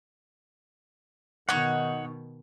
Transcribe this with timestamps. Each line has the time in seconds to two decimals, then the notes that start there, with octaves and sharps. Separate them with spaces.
1.49 B2 D#3 D#4 C#5 F#5 C#6